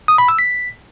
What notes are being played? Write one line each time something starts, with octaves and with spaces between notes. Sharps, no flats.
D#6
B5
E6
B6